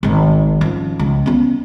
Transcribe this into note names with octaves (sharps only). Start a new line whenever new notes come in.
G#1 D#3
F3 C#4
C#2
B3 C#4